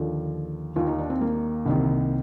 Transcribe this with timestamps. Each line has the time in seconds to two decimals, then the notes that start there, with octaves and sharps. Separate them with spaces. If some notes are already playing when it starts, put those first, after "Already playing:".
Already playing: D#2 D3 F3 A4
0.76 D#2 D#3 F4
0.87 D#4
0.99 D4
1.10 C4
1.21 A#3
1.66 C2 C3 D#3